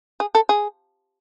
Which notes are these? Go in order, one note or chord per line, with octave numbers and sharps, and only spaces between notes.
G#4
A4
G#4